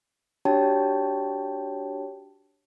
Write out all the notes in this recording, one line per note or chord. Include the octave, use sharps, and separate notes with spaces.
D4 F#4 G4 C#5 G5 A5